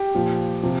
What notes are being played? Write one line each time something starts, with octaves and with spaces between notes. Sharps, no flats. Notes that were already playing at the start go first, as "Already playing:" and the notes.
Already playing: G4
A#2 F3
C3 F3